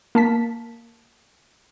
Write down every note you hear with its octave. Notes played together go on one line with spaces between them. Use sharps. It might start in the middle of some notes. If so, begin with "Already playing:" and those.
A#3 A5 B6